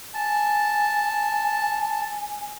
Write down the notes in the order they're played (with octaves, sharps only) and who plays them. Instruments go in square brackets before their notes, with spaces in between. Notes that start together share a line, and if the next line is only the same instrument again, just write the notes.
[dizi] G#5 [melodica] A5